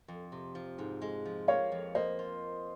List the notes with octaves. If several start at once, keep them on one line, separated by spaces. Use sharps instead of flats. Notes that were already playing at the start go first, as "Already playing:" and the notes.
F2
C3
F3
G#2
G#3
F3
A#3 C#5 F5
F2
A#3 C5 D#5
F4